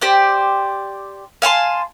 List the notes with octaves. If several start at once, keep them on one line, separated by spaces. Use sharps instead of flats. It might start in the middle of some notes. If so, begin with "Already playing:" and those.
G4 C5 D5
F5 G#5 A5 C6